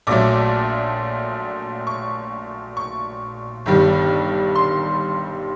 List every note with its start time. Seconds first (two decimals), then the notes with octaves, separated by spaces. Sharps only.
0.07 A#1 A#2 F#3 A3 D6
1.87 C#6
2.77 C#6
3.66 G1 G2 D#3 G3
4.55 C6